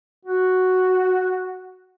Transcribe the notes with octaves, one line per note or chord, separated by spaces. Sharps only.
F#4